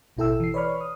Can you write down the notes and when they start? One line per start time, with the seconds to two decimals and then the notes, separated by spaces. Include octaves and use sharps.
0.17 A1 B2 E4 A4 G5 E6
0.40 E3 C7
0.54 B4 C#5 D5 B5 C#6 F6
0.81 D#6